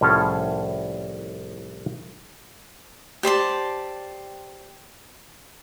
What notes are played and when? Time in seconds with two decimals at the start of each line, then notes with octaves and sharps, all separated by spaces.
0.01 C2 A2 F3 C#4 G#4 A4
3.23 G4 C5 D5 A5